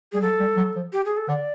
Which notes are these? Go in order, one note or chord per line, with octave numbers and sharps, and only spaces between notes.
G3 G#4
F#3 A4
G3
F#3
F3
G4
G#4
A4
D3 D5